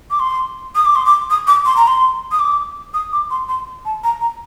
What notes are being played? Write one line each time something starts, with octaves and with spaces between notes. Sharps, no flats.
D6
C6
D#6
D6
C6
D6
D#6
D6
C6
A#5
C6
D#6
D6
D#6
D6
C6
C6
A5
A#5
A#5